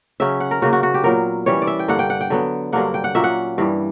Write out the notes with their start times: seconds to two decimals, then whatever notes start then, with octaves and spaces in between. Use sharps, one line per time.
0.20 C#3 F#3 C#4 E5
0.40 F#5
0.51 A#4
0.62 C#3 F#3 A#3 F#4
0.73 F#4
0.83 F#4
0.94 G4
1.04 A#2 F#3 B3 A#4
1.46 E3 G3 C#4 C#5
1.62 D5
1.67 E5
1.79 G5
1.88 G2 D3 A#3 F#5
1.99 G5
2.10 F#5
2.21 G5
2.30 D3 F#3 B3
2.72 G2 D3 F#3 A#3 F#5
2.94 G5
3.04 F#5
3.15 A#2 F#3 A#3 C#4 E5
3.24 F#5
3.58 G2 E3 G3